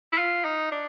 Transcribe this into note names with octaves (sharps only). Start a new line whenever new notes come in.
E4
F4
D#4
D4